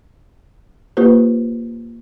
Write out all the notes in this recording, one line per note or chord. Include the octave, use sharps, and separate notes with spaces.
A#3 F4 G4 B4 C5